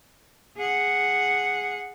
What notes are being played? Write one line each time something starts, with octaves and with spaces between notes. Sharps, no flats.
G#4 F#5